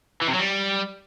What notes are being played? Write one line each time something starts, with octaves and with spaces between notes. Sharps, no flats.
E3
C3
F#3
G3